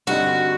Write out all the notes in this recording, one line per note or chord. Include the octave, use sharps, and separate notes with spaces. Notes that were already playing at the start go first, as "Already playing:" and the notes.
G2 D3 G3 C4 D#4 F#4